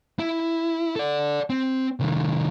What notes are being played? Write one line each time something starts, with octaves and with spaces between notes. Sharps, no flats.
E4
A4 D5
C4
C2 D#3